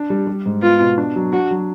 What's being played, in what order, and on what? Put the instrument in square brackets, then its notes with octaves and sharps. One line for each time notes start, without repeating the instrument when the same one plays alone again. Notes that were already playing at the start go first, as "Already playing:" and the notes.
Already playing: [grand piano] D4
G3
G3
G#2
[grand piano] B3 [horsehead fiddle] F4
[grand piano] B2
D4
F#3
[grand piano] D4 [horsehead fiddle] F#4
[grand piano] F#3